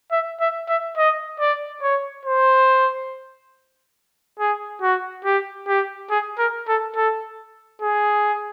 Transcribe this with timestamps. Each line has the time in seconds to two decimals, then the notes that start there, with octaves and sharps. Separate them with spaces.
0.11 E5
0.40 E5
0.69 E5
0.97 D#5
1.40 D5
1.82 C#5
2.25 C5
4.39 G#4
4.82 F#4
5.25 G4
5.68 G4
6.10 G#4
6.39 A#4
6.68 A4
6.96 A4
7.81 G#4